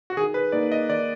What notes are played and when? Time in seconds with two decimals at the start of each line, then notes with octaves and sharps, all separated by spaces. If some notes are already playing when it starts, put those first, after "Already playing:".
0.10 F#4
0.17 D#3 G#4
0.34 B4
0.52 A#3 D#4 D5
0.72 D#5
0.89 D#3 D5